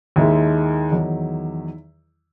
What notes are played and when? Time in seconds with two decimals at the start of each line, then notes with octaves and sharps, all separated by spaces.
0.16 D#2 D#3 G#3 E4
0.91 E2 D#3 F#3